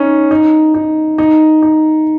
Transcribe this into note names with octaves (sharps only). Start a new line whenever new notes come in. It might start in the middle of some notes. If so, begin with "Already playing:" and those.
Already playing: C#4 D#4
D#4
D#4
D#4
D#4